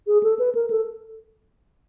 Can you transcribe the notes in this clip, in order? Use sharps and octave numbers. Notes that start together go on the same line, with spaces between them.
G#4
A4
B4
A#4
A4